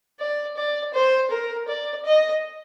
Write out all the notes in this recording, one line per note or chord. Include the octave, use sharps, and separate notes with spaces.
D5
D5
C5
A#4
D5
D#5